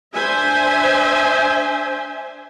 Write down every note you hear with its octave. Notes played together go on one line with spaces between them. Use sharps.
D4 C5 E5 G#5